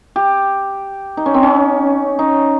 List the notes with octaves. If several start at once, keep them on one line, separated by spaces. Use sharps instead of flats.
G4
D#4
C#4
C4
C#4
D#4